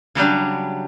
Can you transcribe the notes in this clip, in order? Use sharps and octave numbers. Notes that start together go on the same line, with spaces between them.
C#3 F#3 G3 D4